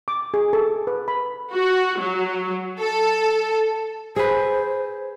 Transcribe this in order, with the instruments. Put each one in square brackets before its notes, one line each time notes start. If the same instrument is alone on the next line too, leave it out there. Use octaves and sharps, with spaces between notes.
[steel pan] D6
G#4
A4
B4
B5
[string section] F#4
F#3
A4
[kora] G#4 B4 [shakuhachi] C5